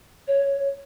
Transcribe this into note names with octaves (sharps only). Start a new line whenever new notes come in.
C#5